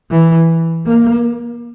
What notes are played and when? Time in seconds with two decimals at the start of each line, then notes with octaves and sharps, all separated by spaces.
0.11 E3
0.86 A#3